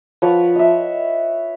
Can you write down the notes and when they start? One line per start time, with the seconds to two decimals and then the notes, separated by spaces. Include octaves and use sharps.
0.22 F3 B4 C#5 F#5
0.56 D#5 E5